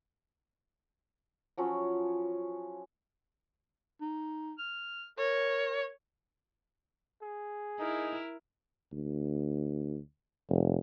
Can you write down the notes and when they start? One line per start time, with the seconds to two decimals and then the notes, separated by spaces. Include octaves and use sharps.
1.57 F3 F#3 C#4
4.01 D#4
4.58 F6
5.18 A#4 C#5
7.22 G#4
7.79 D#4 E4 A#4
8.93 D2
10.49 F1